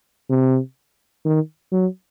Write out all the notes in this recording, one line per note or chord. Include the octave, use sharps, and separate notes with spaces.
C3
D#3
F#3